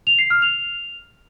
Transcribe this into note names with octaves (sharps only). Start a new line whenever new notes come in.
F7
C7
F6
F7